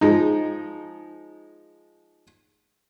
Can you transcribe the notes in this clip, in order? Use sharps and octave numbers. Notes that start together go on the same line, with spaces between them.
F3 G#3 D#4